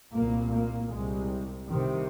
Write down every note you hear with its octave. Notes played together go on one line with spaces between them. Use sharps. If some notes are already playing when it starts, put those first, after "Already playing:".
C2 A#2 A#3
A#3
C2 C3 G#3
C2 C3 D#3